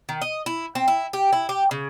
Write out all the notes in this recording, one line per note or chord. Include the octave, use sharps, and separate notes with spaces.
D#3
D#5
E4
C4
E4
G4
E4
G4
C#3